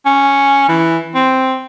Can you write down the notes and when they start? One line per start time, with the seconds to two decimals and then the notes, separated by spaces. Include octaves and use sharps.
0.06 C#4
0.69 E3
1.15 C4